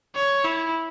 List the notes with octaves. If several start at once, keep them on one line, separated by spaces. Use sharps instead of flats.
C#5
E4